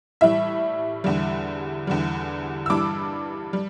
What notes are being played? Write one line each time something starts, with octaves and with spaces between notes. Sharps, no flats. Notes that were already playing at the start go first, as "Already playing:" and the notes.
A2 E3 G3 E5
E2 D3 G3
E2 D3 G3
E6
G2 E3 G3 D6
G3